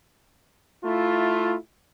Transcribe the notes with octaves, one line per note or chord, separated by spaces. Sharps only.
A3 E4 F4